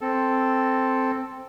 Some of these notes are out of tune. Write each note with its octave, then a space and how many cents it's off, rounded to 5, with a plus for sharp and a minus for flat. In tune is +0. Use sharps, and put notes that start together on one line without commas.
C4 +0 A4 +0